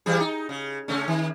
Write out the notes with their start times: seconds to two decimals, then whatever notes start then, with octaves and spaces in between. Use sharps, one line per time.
0.06 E3 G3 G#4
0.20 D#4
0.49 C#3
0.88 C#3 A3 C#4
1.08 D#3